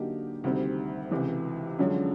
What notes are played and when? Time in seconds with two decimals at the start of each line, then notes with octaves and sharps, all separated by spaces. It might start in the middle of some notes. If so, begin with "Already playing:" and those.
Already playing: D3 F#3 A#3 D#4 G4
0.44 D2 C3 D#3 G3 C4
1.11 C#2 C3 E3
1.78 F#2 D3 F3 G#3 C#4